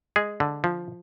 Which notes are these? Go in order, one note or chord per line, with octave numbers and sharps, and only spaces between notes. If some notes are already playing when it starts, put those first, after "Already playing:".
G#3 G#4
D3
F3